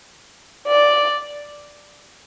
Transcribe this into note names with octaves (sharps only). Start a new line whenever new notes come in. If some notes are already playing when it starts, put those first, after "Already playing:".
D5